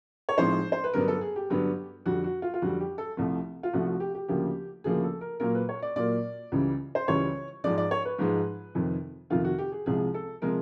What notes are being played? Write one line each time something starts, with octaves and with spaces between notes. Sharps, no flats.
C#5
A2 F3 G#3 C4 D#4 C5
C5
B4
G2 D3 F#3 B3 D4 A#4
A4
G#4
G4
G2 D3 F#3 B3 D4
F2 D3 G3 F#4
F#4
F4
F4
F2 D3 G3 F#4
G4
A4
C2 C3 F3 A3
F4
C2 C3 F3 A3 F#4
F#4
G4
G4
D2 C#3 F3 A#3 D4 G4
D2 C#3 F3 A#3 D4 G#4
A4
A#4
A#2 F#3 A#3 A#4
B4
C#5
D5
A#2 F#3 A#3 D5
C#2 C#3 E3 G3
C5
C#2 C#3 E3 G3 C#5
G#2 F3 G#3 D5
D5
C#5
B4
G#2 F3 G#3
F2 C3 D#3
F2 C3 D#3 F4
F#4
G4
G#4
C2 C3 F3 G#3 G#4
A4
C3 F3 G#3 A#4